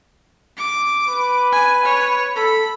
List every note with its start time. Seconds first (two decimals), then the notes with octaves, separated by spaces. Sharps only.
0.57 D6
1.09 B4
1.52 G#5
1.85 C#5
2.36 A4 B5